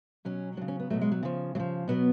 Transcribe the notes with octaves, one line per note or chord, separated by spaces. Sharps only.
B2 F#3 C#4
C#3 F#3 D4
C#4
B3
B2 F#3 A3
G#3
F#3
C#3 F3
C#3 F3 F#3
B2 F#3 B3